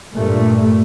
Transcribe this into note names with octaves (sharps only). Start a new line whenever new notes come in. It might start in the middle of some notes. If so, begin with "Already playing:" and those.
G2 A#2 A3